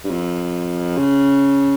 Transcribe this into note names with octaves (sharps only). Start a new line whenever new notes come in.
G2
F2
C#3